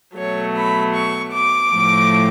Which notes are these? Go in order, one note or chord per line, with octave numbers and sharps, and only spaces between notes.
B2 F#3 A3 C#5
B5
C#6
D6
A2 F3 A3